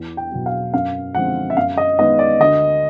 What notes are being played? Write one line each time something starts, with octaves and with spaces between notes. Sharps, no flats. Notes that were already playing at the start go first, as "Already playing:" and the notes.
Already playing: E2
G5
B2 F#3
F5
F#2 F5
D3 F3 G#3 C4 F#5
E5
F#2 F5
D#5
D#3 G#3 B3 D#5
D5
D2 D#5